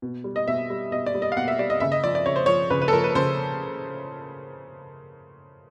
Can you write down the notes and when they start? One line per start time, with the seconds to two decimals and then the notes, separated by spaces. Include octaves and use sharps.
0.02 B2
0.24 G3
0.36 D#5
0.48 B2 E5
0.70 G3
0.91 B2 D#5
1.06 D5
1.15 G3
1.22 D#5
1.32 F5
1.37 B2 F#5
1.48 E5
1.59 G3 D5
1.70 D#5
1.80 C#3 E5
1.92 D#5
2.04 F3 D5
2.15 D5
2.26 C#3 C#5
2.36 C5
2.46 F3 C#5
2.70 C#3 B4
2.82 B4
2.88 A4
2.93 F3 A#4
3.04 B4
3.15 C#3 C5